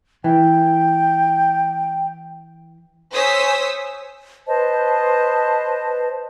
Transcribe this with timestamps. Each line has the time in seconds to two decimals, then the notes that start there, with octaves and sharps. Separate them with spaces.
0.24 E3 G5
3.12 C5 C#5 G#5 D#6 E6 B6
4.47 B4 C5 D#5 A5